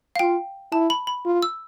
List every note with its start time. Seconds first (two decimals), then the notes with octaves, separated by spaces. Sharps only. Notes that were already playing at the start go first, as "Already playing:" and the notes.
0.16 F5
0.19 F4 G5
0.72 E4 A5
0.90 B5
1.07 B5
1.25 F4
1.42 E6